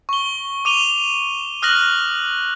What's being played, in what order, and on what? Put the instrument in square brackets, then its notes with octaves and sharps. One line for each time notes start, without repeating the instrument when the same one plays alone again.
[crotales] C#6 G7
D6 D#7 F7 G7
D#6 F6 F#6 A#6 F#7